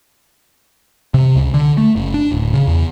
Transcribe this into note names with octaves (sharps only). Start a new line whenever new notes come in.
C3
C#2
D3
A3
F#1
D4
D1
C#3
E2